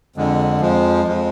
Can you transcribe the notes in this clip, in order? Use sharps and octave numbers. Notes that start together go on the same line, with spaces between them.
F2 D3 G#3
F2 F3 G#3
F2 F3 G#3